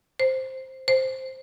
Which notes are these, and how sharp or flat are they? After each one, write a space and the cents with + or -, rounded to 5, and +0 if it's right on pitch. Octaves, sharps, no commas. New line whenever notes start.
C5 +5
C5 +5